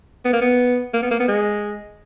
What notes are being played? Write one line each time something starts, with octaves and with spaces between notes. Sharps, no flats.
B3
A#3
B3
A#3
B3
A#3
B3
G#3